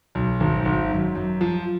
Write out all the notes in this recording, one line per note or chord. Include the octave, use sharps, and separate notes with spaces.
B1
G#1
G#1
F#2
F#2
F3